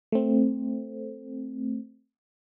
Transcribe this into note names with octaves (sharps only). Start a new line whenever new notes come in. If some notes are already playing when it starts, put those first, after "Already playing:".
A3 C4